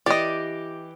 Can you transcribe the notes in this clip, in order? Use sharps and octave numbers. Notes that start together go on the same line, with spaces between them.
E3 G4 D5 D#5